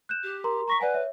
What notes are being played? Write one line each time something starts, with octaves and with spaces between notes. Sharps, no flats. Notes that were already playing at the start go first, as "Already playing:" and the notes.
F#6 G6 E7
G4
A#4 A#5 C6
A#5 C#6 A#6 B6
B4 D5 F#5 G#5
C#5 E5